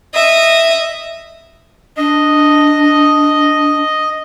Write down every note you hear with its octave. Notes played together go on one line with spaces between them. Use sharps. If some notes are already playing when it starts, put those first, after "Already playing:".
D#5 E5
D4 D#5